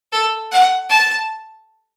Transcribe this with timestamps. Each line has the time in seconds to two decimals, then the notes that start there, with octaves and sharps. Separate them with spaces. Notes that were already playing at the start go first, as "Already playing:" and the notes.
0.12 A4
0.52 F#5
0.90 A5